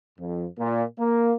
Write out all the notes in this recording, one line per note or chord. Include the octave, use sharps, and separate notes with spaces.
F2
A#2
A#3